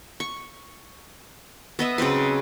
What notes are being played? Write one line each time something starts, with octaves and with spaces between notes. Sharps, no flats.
C#6
B3 D#5 E5
C#3 F#3 C4 B4